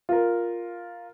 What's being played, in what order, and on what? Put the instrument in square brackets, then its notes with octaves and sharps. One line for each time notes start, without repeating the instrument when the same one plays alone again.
[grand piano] F4 A#4